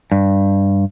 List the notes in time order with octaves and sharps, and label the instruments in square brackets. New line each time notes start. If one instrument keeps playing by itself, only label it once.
[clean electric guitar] G2